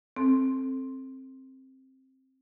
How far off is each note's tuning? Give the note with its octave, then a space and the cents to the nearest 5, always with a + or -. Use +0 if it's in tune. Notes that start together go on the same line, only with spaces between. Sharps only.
C4 +15 A4 +0